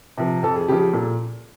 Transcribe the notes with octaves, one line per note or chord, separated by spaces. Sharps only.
C3 F3
F2 A4
G#4
C#3 F3 G4
G4
A#2 A4